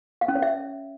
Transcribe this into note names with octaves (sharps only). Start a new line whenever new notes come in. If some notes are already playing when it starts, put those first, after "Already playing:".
F5
C#4
C#5
E5